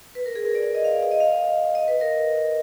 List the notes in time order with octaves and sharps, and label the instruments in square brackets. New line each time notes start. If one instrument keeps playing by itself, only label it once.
[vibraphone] B4
A#4
G#4
A#4
D5
D#5
F5
D#5
F5
D#5
F5
D#5
D#5
B4
A#4